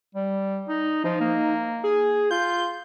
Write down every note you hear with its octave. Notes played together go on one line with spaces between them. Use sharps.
G3
D#4
F3 D#4
A#3
G#4
F4 G6